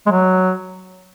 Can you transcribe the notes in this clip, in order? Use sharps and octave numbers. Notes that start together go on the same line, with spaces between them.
G#3
F#3